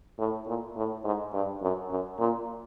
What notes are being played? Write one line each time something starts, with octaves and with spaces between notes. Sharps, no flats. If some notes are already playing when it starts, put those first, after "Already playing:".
A2
A#2
A2
G#2
G2
F#2
F#2
A#2